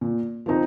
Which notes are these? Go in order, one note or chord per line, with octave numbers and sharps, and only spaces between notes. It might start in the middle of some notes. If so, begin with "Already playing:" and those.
A#2
F3 C4 D#4